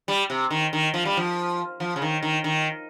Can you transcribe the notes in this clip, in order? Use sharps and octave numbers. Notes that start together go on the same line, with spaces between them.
G3
C3
D#3
D#3
F3
G3
F3
F3
C#3
D#3
D#3
D#3